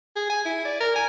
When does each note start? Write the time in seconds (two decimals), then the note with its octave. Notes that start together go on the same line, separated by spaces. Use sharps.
0.16 G#4
0.29 G#5
0.45 E4
0.65 D5
0.80 A#4
0.95 G#5